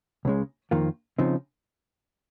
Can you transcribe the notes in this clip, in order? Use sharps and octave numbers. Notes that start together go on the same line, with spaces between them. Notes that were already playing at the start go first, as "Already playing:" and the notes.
C#2 C#3 G#3
F2 D#3 A#3 F4
C#3 F3 C4 D#4